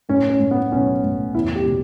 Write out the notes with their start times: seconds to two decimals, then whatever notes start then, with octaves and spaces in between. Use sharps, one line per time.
0.09 A2 C#4
0.30 C#4
0.40 A2
0.51 B3
0.72 B1 C#4
1.04 A2
1.35 E2 E4
1.56 G4
1.66 B2